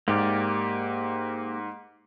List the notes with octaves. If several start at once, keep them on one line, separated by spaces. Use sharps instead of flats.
G#2 A#3 G4 D5